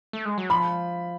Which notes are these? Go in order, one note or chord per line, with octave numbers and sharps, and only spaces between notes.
A3
G#3
F#3
F3 B5